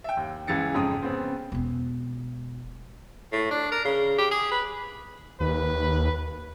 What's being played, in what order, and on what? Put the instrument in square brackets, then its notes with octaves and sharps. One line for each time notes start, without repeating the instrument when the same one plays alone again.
[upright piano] E5 G5
D#2
C#2 E3 A6 C#7
F2 G#2 C#3 G5 D#6
C#3 B3 C4
[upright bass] E1 B3
[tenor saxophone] A2
D4
A#4
C#3
G4
G#4
B4
[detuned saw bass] D#2 [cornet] B4